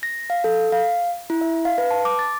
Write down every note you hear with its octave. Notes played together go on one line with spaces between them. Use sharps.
A#6
F5
A4
F5
E4
E5
F5
B4
A5
D6
A6